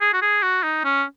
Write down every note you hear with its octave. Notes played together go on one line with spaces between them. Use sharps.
G#4
F#4
G#4
F#4
D#4
C#4